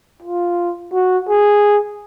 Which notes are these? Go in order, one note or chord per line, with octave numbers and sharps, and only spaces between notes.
F4
F#4
G#4